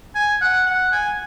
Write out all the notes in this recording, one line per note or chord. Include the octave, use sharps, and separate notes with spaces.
G#5
F#5
F#5
G#5